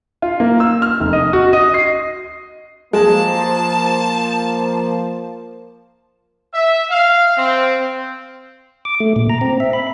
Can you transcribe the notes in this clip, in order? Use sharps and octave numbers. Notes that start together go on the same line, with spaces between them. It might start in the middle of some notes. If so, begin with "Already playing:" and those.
F4
A#3
E6
F6
F1
D#5
F#4
D#5
C7
F3 G#3 A#3 A5
E5
F5
C4
D6
A3
A#2
A#5
C4
E5
B5